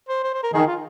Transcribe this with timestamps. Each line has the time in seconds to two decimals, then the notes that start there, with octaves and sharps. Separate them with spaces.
0.09 C5
0.23 C5
0.33 C5
0.43 A#4
0.53 D#3 G#4
0.67 F4